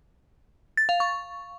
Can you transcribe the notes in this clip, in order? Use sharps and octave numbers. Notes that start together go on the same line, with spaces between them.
A6
F5
C#6